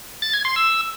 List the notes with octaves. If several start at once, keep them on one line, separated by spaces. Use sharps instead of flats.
A6
G#6
C6
E6